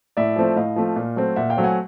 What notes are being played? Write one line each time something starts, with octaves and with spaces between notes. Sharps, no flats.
A2 D5 E5
F3 A3 C4
A2 D#5 F5
F3 A3 C4
A#2
F#3 A3 C4
A#2 E5 F#5
F5 G5
F#3 A3 C4
F#5 G#5